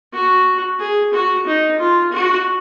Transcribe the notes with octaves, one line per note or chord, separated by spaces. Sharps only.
F#4
G#4
F#4
D#4
F4
F#4